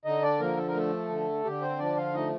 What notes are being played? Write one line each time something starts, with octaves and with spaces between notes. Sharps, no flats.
D3 D#4 D#5
D4 D5
F3 A#3 A#4
A4
A#4
A3 A4
D3
D3 G4
C4 C5
F3 D4 D5
F4 F5
A3 D#4 D#5